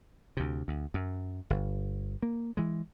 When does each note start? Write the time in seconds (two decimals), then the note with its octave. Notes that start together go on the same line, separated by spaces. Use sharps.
0.37 D2 C3
0.68 D2
0.94 F#2
1.50 G1
2.23 A#3
2.57 E3 G#3